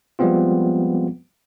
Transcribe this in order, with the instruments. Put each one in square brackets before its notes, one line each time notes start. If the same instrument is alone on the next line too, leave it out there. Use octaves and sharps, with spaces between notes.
[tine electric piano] F3 G3 G#3 B3 C4 F4